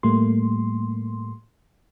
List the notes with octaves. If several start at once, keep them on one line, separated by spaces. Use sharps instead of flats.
A2 G3 A3 A#3 C6